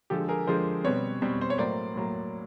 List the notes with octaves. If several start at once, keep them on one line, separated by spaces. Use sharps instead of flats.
D3 F3 G#3 G4 A4
G#4 A#4
D3 F3 G#3 A#4 C5
B2 G3 C4 B4 C#5
B2 G3 C4
C5
C#5
A2 F#3 A#3 C5 D5
A2 F#3 A#3